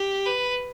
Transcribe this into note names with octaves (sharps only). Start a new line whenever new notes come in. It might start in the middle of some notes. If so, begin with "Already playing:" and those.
Already playing: G4
B4